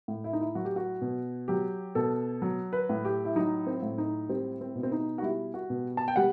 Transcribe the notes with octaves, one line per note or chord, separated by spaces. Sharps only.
A2
E4
D#4
E4
F#3 F#4
G4
F#4
B2
F#3 G4
B2 A4
F#3
B4
A2
G4
E4
F#3 D#4
C4
A2
D#4
G3 C4
C4
B2
C4
D#4
F#4
G3 E4
F#4
B2
A5
G5
G3 F#5